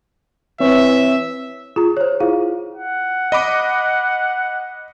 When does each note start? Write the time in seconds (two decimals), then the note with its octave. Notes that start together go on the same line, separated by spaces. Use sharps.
0.60 E3 C4 C#5 E5
1.76 F4 G#4 A#5
1.97 C5 C#5
2.20 E4 F4 G#4 F5
2.74 F#5
3.32 D#5 B5 D6